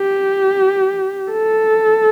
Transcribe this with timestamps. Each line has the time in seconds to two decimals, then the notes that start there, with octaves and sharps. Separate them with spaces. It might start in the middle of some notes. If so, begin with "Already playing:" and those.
Already playing: G4
1.31 A4